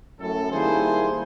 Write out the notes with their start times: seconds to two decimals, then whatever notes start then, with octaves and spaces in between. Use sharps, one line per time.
0.20 F#2 A2 A4
0.52 D#3 G3 A#3 E4 G#4 C5